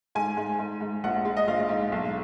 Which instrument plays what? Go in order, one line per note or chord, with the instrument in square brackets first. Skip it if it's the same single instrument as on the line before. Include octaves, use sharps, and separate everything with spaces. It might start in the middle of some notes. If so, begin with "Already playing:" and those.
[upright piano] G#2 G#5
G#2
G#2
G#2
A#1 F#5
G#3
D#5
A#1 F5
G#2
B1